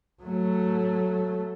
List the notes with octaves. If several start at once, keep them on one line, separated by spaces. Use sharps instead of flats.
F#3 A3